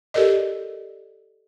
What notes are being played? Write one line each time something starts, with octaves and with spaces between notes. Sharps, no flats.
G4 A4 A#4 D5 D#5